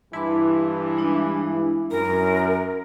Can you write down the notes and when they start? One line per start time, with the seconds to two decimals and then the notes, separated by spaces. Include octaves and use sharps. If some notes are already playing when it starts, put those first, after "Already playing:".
0.13 G2 E3 E4 A5 C6 D6
0.97 G#3 D4 D#4
1.91 F#2 A#4 A#5